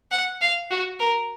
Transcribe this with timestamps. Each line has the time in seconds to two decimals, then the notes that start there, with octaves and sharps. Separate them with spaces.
0.11 F#5
0.41 F5
0.71 F#4
1.00 A#4